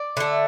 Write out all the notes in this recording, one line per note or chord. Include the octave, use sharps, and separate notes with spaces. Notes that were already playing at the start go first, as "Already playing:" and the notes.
Already playing: D5
D3 A3